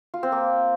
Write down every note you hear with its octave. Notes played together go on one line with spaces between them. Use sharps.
F4
C4
A#3